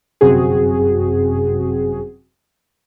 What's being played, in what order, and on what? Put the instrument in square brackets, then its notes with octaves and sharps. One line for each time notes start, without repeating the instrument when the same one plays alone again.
[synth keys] G1 F#2 C3 C4 F#4 G#4